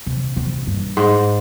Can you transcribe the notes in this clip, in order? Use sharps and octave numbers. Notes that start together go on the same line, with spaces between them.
C3
C3
G2
G#2